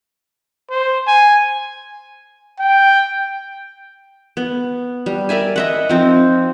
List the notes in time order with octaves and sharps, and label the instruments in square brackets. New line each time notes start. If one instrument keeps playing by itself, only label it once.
[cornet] C5
G#5
[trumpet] G5
[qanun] B3
G3
A#4 D5 E5 G#5
D#5 E5 F#5
F3 C4 D#4